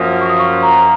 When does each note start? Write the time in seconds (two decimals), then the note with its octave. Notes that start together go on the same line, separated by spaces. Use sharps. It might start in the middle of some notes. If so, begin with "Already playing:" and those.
Already playing: F#2 F3 A#3 D#6
0.21 C#6
0.29 D#6
0.40 C#6
0.63 A#5
0.75 A#5